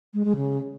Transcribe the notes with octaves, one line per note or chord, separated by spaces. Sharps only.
G#3
G#3
C#3